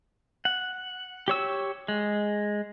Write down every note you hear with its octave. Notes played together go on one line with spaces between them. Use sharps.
F#5
G4 C#5 E6
G#3